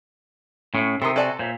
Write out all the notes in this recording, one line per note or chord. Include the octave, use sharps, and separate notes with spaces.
A2 C#4
C3 D#3 A4 A#4 C6 D#6
F#4 A4 D5 E5 G#5 A5
A#2 C5 C#5 E5